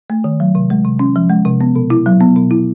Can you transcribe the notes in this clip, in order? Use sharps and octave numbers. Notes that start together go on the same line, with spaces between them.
A3
D#3
F#3
C3
G#3
C3
C#4
F3
G#3
C3
B3
B2
E4
F#3
B3
B2
E4